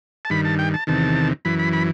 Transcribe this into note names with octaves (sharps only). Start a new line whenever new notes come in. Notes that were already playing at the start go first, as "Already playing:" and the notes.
A5
G2 D#3 B5
A5
G5
A5
E2 C3 D#3 A5
F#2 E3 B5
B5
B5